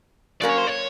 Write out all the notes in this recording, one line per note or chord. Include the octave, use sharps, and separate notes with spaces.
F#3 A#3 C#4 D5
C#5
C5
C#5